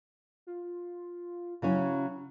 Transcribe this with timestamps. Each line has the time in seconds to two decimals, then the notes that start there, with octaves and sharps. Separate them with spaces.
0.47 F4
1.62 C#3 F#3 C#4 E4